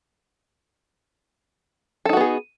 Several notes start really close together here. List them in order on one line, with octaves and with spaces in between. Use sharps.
A4 D#4 F#4 B3 G#4